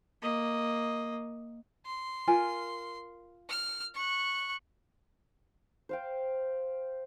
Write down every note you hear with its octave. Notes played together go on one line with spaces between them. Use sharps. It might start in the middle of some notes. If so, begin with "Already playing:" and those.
A#3 D#5
C6
F4 A#4 G#5
F6
C#6 F#6
C5 F5 G5